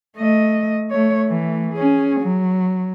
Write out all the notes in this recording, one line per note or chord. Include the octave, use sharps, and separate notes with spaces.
A3 D#5
A3 C#5
E3 A3
C#4 G#4
F#3